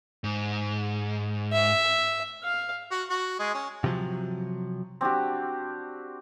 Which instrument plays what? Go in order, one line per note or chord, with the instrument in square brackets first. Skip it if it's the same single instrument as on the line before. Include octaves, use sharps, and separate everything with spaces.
[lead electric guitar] G#2
[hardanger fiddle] E5
[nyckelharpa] F5
[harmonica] F#4
F#4
G#3
C#4
[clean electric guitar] C3 F3 F#3
[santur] C4 D4 F#4 G4